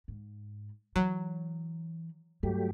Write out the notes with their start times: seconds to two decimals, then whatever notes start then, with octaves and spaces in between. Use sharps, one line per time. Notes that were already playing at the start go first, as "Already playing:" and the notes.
0.08 G#2
0.96 E3 F#3
2.43 G2 F#3 A3 G4